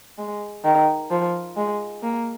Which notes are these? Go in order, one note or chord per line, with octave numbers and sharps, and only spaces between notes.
G#3
D#3
F3
G#3
A#3